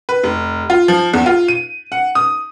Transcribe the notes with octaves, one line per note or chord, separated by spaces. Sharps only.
B4
F1
F4
F3
E2
F4
D#7
F#5
D#6